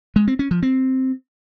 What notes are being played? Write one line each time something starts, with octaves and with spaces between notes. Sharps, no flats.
G#3
C4
C#4
F3
C4